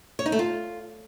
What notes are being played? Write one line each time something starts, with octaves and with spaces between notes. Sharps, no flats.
C#5
D#4
A3
F4